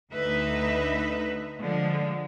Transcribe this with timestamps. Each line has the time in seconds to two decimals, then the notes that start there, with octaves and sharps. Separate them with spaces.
0.11 D2 D3 D#4 B4 E5
1.60 D3 F3 G#3